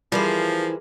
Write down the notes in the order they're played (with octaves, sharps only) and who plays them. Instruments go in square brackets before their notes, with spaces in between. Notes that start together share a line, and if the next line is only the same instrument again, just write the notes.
[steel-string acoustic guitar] E3 E4 C5 [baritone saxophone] F3 [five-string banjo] G3 [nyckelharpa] G#4 A#4